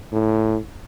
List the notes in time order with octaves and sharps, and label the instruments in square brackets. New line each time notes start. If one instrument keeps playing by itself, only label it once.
[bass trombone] A2